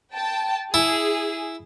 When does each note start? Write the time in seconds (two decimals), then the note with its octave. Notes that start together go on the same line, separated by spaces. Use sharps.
0.13 G5 A5
0.74 E4 G#4